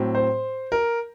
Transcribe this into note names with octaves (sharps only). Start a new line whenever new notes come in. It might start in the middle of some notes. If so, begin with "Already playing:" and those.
Already playing: A2 F#3 C4
C5
A#4